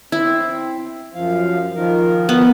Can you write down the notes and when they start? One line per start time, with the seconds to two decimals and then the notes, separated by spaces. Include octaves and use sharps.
0.12 C4 E4
1.15 F#2 F3 F5
1.74 D#3 F3 A#4
2.29 B3